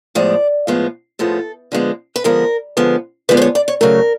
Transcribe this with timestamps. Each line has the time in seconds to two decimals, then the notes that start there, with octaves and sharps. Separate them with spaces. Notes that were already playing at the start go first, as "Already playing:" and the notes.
0.15 A2 F3 G#3 B3 D5
0.67 A2 F3 G#3 B3
1.19 A2 F3 G#3 B3 A4
1.72 D3 F3 G#3 B3
2.16 B4
2.24 D3 F3 G#3 B3 A#4
2.77 D3 F3 G#3 B3
3.29 D3 F3 G#3 B3 B4
3.37 C5
3.42 C#5
3.55 D5
3.68 C#5
3.81 C#3 F#3 A3 A#4